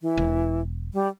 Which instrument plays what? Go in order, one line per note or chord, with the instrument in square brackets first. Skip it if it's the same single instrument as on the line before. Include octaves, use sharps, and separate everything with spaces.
[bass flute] E3
[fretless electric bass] E1
[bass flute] G3